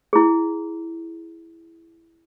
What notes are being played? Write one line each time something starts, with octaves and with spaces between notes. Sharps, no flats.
E4 G#4